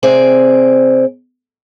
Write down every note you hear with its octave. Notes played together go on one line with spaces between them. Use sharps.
C3 C4 G#4 D5